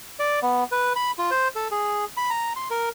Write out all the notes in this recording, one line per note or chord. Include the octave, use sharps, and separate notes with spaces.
D5
B3
B4
B5
F4
C5
A4
G#4
B5
A#5
C6
A#4